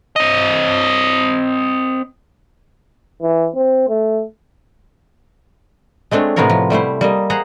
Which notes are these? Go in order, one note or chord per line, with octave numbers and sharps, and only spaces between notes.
C4 D#5
E3
C4
A3
G#3 A3 C4 D4 C#5
A2 C3 B3 F4 A#4 C#5
F3
G3 A3 E4 C5
G3 A#3 D#5
G#4 C5 F#5 A#5